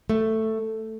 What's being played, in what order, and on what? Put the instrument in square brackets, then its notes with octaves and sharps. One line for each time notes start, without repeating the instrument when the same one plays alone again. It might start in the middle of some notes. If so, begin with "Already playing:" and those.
[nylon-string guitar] A3